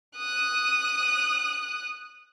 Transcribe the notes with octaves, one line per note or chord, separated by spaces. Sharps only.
D#6 F#6